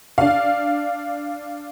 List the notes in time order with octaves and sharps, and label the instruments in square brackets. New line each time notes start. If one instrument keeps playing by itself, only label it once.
[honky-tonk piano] D4 F5